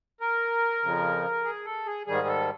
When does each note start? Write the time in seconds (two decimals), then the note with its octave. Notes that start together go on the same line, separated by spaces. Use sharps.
0.20 A#4
0.83 F2 C#3 F3
1.44 G#4
1.65 A4
1.87 G#4
2.07 G#2 D#3 G3 G#4
2.27 A4